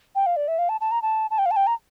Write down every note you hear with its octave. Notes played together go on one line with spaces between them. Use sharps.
G5
F5
D5
E5
F5
A5
A5
A#5
A5
A5
G5
F5
A5
G5
A#5